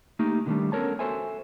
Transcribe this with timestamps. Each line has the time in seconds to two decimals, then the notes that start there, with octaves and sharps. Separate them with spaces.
0.19 A3 A#3 D#4 G4
0.46 D3 D#3 F#3 G3 A3 D4
0.72 B3 C#4 A4 A#4 C#5 A5
0.99 F#4 A4 C5 E5 G#5